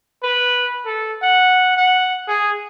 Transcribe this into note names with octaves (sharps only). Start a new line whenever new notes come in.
B4
A4
F#5
F#5
G#4